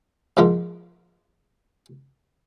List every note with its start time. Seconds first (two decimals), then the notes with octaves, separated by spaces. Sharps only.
0.37 G#2 F3 A#3 F4